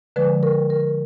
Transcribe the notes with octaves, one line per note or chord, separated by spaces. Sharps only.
D3 F3 G#3 B4
A#4
A#4